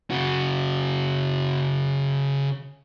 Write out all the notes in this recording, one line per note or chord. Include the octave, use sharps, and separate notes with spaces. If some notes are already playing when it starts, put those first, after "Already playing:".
C#3 F#4